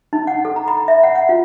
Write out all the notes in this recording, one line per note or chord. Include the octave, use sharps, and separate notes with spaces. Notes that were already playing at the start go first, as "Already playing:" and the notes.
D#4
F#5
A4
A#5
B5
E5
F#5
F#5
F4